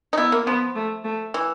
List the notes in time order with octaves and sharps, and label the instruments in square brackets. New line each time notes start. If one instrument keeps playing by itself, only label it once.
[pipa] D#4
[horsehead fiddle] B3 [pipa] E4
[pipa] A#3
[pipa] F3 [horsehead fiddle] B3
[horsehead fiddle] A3
A3
[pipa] E3